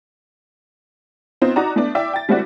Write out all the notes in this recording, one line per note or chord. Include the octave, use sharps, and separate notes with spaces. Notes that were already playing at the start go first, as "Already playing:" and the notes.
B3 C4 D#4 F4
D#4 F#4 D5 A#5
A3 B3 D4
E4 D5 E5 G5 D6
G5 A6
G3 A3 C4 E4 F#4 D5